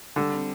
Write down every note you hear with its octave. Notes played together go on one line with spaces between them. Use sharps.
D3 G3
C4